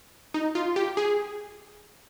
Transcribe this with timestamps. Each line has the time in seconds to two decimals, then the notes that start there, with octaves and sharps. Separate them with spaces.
0.34 D#4
0.55 F4
0.76 G4
0.97 G#4